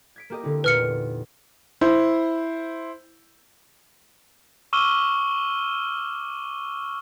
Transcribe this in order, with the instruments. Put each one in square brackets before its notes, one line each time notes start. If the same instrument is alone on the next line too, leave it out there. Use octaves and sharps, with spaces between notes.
[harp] G#6 B6 D7
A#3 G4 D#5
D3 C4 E4
[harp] E2 A#2 D#4 [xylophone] B4 F6 C#7
[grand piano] E4 C5
[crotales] C#6 D6 E6 F6 D#7 G7